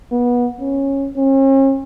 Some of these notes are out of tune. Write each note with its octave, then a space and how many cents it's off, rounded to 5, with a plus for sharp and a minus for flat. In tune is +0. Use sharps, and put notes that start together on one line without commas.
B3 -25
C#4 -15
C#4 -45